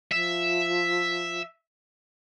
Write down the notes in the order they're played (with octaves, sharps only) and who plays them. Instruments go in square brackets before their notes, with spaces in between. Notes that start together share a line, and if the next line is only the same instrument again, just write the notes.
[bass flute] F3 [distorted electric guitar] E5